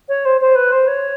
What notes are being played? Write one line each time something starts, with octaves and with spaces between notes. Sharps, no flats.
C#5
C5
C5
B4
C5
C#5